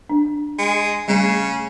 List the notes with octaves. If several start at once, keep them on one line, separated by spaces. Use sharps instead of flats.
D4
G#3
C#3 G3 A3